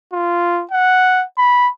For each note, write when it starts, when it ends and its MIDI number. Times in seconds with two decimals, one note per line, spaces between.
0.13 0.63 65
0.72 1.24 78
1.38 1.69 83